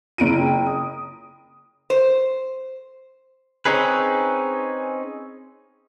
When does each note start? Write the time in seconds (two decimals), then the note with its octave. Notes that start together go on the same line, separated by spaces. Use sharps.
0.18 F#1 E4 F4 D7 D#7
0.37 G5
0.67 D#6
1.90 C5
3.65 C4 C#4 D#4 G#4 B4